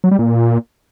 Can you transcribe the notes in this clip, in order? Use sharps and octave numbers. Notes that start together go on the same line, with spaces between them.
F#3
G3
A#2